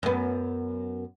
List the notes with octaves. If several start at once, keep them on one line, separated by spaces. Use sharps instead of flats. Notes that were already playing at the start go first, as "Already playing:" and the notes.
F#2 B3